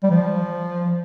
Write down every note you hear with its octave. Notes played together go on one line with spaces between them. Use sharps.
G3
F3